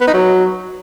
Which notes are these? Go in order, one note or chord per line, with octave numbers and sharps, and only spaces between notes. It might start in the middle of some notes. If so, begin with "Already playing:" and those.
B3
D#4
F#3